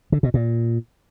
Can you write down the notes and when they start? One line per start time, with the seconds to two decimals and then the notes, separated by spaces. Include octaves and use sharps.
0.12 D3
0.23 B2
0.34 A#2